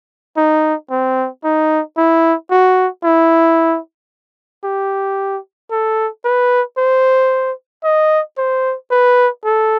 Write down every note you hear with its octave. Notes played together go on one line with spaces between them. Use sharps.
D#4
C4
D#4
E4
F#4
E4
G4
A4
B4
C5
D#5
C5
B4
A4